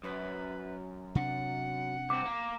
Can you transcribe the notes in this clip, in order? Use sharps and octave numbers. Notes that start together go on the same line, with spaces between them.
F#2 B4
C3 D4 F#5
C2 C4 D6
A#3